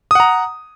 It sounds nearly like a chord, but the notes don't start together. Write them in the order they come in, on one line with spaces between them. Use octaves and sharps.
D#6 F#5 A#5